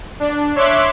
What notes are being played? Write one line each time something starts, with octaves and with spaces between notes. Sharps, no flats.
D4
C#5 E5 C6 D6 F#6 B6